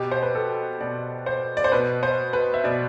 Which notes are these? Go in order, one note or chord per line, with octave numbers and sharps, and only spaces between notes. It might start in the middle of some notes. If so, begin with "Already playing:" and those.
Already playing: B2 G4
C5
B4
A4
B2 D5
C5
D5
C5
B2 B4
C5
B4
E5
B2 D5